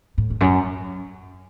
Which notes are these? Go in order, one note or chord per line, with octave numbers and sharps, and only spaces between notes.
A2
E2
F#2